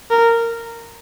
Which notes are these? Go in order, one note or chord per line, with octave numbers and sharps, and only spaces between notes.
A#4